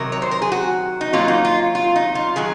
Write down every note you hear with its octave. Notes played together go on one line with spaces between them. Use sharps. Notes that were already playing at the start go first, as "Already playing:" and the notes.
Already playing: C3 D#3 F#3 A#4
C#5
C5
A#4
G#4
F#4
D#4
D#3 F#3 A#3 C#4 F4
D#4
F4
F4
D#4
F4
D#3 F#3 G#4